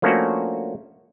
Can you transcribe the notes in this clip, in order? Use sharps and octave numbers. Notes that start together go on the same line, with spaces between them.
F3 A3 A#3 C#4 D4 F#4